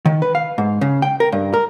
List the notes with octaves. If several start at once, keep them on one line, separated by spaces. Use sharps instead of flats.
D#3
B4
F5
G#2
C#3
G5
A#4
G2
A#4